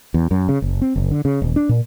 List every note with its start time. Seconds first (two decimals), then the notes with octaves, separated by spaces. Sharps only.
0.14 E2
0.31 F#2
0.49 C#3
0.62 F#1
0.82 C4
0.96 F#1
1.11 D3
1.25 C#3
1.42 D#1
1.56 D4
1.69 A#2